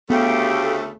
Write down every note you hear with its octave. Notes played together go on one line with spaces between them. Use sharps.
D2 C#3 A3 B3 G4 F5